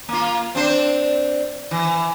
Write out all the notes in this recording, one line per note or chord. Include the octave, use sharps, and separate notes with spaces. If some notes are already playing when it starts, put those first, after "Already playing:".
A#3 F4
C4 D4 C5
E3